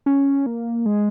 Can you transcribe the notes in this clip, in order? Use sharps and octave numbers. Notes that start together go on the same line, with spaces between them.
C#4
A#3
G#3